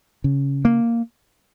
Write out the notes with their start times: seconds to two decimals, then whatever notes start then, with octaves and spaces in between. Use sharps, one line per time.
0.24 C#3
0.65 A#3